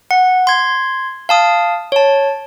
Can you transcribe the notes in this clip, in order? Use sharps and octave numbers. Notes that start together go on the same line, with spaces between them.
F#5
C6 G#6
F5 A5 D#6
C#5 A5